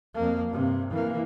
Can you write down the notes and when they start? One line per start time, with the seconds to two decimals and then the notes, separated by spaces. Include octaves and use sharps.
0.15 F2 A#3
0.49 G2 C3
0.91 E3 A#3